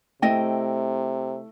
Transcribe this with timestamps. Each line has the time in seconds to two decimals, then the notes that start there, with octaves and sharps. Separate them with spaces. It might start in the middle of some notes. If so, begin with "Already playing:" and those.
0.22 C3 A3 E4 D#5 G5